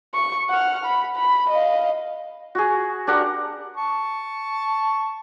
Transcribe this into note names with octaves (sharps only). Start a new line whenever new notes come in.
C#6
F#5 F6
B5
B5
D#5 F5
F#4 G#4
D4 G4 A#4 F#5
A5 C#6